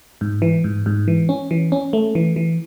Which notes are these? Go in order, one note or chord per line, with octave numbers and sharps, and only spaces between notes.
G#2
E3
G#2
G#2
E3
C#4
E3
C#4
A3
E3
E3